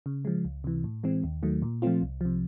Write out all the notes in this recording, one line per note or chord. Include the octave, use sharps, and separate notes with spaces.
C#3
F3 G#3
C#2
C3 E3
A2
E3 G#3 C4
D#2
D#3 F#3 A3
A#2
F3 A3 C4 F4
C2
C3 F3